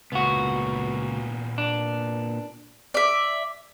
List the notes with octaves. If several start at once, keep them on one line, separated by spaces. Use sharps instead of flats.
C#2 A#2 B3 F#4
D4
D5 E5